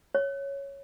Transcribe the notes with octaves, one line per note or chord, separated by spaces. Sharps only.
C#5